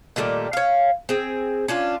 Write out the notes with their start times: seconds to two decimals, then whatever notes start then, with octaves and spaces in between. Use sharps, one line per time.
0.16 A#2 D#3 G3 A3
0.53 C#5 F5
1.09 C4 G#4
1.68 C#4 D4 F4